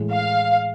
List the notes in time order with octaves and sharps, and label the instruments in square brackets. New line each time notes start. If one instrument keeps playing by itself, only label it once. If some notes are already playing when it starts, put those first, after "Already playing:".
Already playing: [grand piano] A2 E3 G#3
[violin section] F5